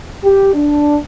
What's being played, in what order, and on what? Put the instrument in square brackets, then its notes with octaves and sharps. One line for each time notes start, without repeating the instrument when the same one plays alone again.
[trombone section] G4
D4